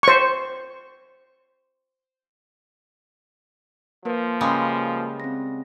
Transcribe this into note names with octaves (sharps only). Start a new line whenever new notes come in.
C5 C#6
F3 A#3 A#4 B4
C#3 G3 G#3
C4 A#6